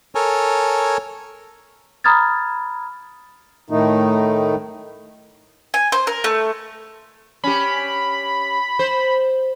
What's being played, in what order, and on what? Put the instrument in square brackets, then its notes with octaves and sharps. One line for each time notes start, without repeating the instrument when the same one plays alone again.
[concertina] A4 A#4 C#5 G#5
[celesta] A#5 B5 D#6 F6 G#6 A6
[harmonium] A2 D#3 A3 D#4
[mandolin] G#5
C5
A#4
A3
[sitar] C#4 G4 [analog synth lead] B5
[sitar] C5